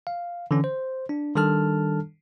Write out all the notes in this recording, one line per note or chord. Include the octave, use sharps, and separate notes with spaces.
F5
D3 E3 C#4
C5
D4
D#3 G3 D4 A4 A5 F6